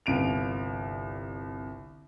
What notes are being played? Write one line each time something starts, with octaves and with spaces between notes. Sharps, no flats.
G1 C2 D7 F7